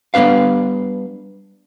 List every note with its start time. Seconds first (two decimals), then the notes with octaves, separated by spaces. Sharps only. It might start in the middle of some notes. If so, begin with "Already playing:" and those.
0.14 G3 B3 D4 B4 F5